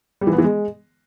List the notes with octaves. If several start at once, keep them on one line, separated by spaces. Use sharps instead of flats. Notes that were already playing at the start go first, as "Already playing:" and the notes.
G3
E3
B3
E3
G#3